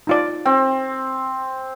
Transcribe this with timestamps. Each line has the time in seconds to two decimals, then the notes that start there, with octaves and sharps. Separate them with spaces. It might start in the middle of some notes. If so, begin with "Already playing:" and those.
0.07 D#4 F4 D5
0.46 C4 G5